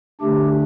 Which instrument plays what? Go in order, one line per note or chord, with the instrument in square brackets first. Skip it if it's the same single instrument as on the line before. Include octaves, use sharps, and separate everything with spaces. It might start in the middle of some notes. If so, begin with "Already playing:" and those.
[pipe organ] D3 A3 D4 G4